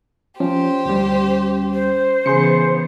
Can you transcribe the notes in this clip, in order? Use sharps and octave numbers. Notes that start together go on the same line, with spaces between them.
F3 C#4 G4 C5
D2 G3
C5
C#3 E3 B3 G#4 C6 C#7